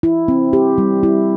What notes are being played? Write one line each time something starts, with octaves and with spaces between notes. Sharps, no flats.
E4
C4
G4
G3
E4